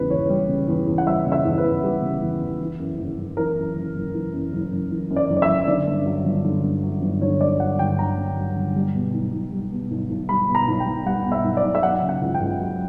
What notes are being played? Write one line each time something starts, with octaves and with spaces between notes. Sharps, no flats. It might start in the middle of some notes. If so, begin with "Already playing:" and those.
Already playing: E2 C#3 G3 B4
E2 C#5
G3
C#3
E2
E2
F#5
G3 E5
C#3
E5
E2
B4
E2
G3 G4
C#3
E2
E2
E3
F#2
F#1
F#1
E3 A#4
F#2
F#1
F#1
E3
F#2
F#1
F#1
E3
F#2
D5
F#1
D5
E5
F#1
D3 D5
G2
F#3
G1
D3
G2
F#3
G1
D3 C#5
G2 D5
F#3 F#5
G1 G5
D3 A#5
G2
F#3
G1
G3
B2
B1
B1
G3
B2
B1
B1
G3 B5
B2
A#5
B1
G5
B1
G3 F#5
B2
E5
B1
D5
B1
E5
F#3 F#5
C#3
F#5
C#2
G5
C#2
F#3